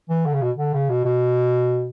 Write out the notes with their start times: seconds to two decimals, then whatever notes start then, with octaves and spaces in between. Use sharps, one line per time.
0.09 E3
0.26 D3
0.33 C#3
0.42 B2
0.57 D3
0.74 C#3
0.89 B2
1.05 B2